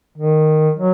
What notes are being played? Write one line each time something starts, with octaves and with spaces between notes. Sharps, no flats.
D#3
F#3